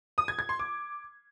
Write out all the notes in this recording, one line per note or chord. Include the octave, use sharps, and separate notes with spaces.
D#6
G#6
G#6
C6
D6